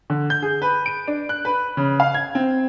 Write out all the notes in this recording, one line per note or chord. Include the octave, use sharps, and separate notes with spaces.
D3
G6
G#4
B4
D7
D4
F#6
B4
C#3
F5
G#6
C4